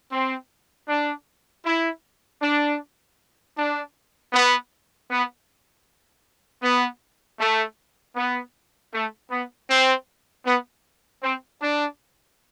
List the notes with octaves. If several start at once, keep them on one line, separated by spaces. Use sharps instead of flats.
C4
D4
E4
D4
D4
B3
B3
B3
A3
B3
A3
B3
C4
B3
C4
D4